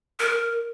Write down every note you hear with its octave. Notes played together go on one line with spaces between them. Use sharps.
A#4